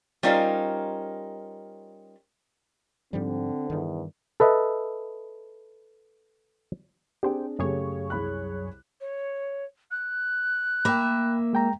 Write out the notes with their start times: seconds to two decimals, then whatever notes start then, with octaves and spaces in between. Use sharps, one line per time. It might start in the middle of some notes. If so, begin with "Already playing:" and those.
0.23 G3 C#4 D#4 F4 A#4 C5
3.13 G#2 D3 F3 G3 C4
3.70 E2 G2 D#3
4.40 A4 B4 D#5 E5
7.23 C4 D4 G4 G#4 C5 G5
7.59 F#2 C#3 A3 G4 G#4 C#5
8.10 C2 B5 F#6
9.01 C#5
9.91 F#6
10.85 A#3 E5 G5 B5
11.53 G#3 G5 A#5